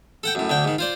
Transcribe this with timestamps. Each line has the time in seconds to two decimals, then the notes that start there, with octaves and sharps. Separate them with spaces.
0.23 A4 F#5 G5
0.35 F#2 A2
0.50 D2 D3 G5
0.64 G#2 D#3
0.79 F4 C5 D5